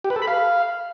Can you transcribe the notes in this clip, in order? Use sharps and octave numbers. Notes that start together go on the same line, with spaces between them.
G4
B4
A4
B5
F5